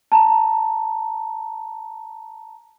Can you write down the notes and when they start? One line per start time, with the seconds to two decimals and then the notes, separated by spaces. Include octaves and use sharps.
0.12 A5 A#5